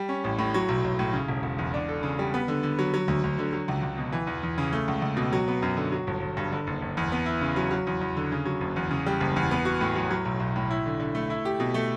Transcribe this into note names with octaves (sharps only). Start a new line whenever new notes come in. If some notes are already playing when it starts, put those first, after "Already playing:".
Already playing: G3
C#4
A1
A2
F#3
B1
B1
A2
C#3
E1
E1
E2
D4
A4
C#3
G3
B3
D3
D3
F#3
F#3
D2
D2
D3
F#3
C#2
C#2
B2
E3
E2
E2
C#3
A3
C#2
C#2
B2
F#3
B3
F#2
D3
F#3
G1
G1
G2
D3
F#1
F#1
E2
B3
E4
C#3
F#3
F#3
E2
E2
D3
C#3
F#3
F#1
E2
C#3
G3
F#1
E2
B3
F#4
A2
F#3
F#3
B1
B1
A2
E4
D3
D3
A3
E4
G4
B2
A3